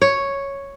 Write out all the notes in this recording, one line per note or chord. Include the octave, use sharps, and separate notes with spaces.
C#5